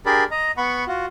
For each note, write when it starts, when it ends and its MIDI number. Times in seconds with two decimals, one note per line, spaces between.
0.06 0.24 62
0.06 0.24 67
0.06 0.24 68
0.06 0.24 70
0.06 0.24 74
0.06 0.24 83
0.31 0.51 75
0.31 0.51 82
0.57 0.85 59
0.57 0.85 78
0.57 0.85 83
0.57 0.85 85
0.87 1.06 65
0.87 1.06 66